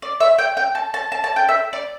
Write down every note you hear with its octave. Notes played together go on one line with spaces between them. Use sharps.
D5
E5
G5
G5
A5
A5
A5
A5
G5
E5
D5